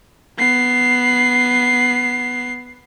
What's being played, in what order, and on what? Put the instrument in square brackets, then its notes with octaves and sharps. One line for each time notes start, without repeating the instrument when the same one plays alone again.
[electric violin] B3 C7